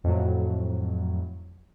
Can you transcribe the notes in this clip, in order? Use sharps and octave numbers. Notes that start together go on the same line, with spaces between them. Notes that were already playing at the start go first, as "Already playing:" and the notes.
F2 A2 F#3